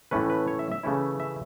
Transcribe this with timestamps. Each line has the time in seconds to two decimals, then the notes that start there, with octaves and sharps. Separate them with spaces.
0.11 A2 E3 A3 C#4 B4
0.30 B4
0.48 C#5
0.59 E5
0.71 E5
0.83 C#3 E3 A3 C#4 E4
1.20 E5